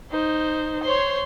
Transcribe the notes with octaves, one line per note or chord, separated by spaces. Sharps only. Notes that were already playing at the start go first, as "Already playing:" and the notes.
D#4 C5
C5 C#5 C6